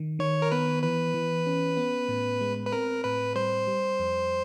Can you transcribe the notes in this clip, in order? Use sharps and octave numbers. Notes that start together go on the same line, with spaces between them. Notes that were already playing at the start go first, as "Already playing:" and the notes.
Already playing: D#3
D#3 C#5
A#4
B3 B4
E3 B4
E3
C#4
B3
A2
G#3
B4
C4 A#4
A2 B4
G3 C5
G3
F2